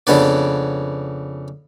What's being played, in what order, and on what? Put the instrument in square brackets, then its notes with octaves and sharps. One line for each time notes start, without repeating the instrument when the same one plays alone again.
[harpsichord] F2 C#3 B3 D4 D5